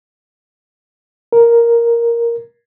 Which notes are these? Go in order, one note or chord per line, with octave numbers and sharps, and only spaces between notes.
A#4